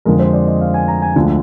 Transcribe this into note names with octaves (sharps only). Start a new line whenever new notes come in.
F2 D3 F3 G#3 A#4
C5
D5
D#5
F5
G#5
A#5
G#5
D2 D3 F3 G#3